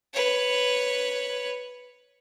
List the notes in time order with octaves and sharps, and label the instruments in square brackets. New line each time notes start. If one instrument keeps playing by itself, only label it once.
[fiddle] B4 C#5